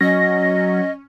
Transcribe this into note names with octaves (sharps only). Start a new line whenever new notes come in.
F#3 C#4 D#5 A#6